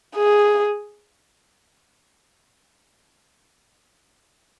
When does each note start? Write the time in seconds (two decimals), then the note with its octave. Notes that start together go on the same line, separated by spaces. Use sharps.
0.16 G#4